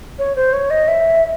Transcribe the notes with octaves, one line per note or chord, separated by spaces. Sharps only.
C#5
C5
C#5
D#5
E5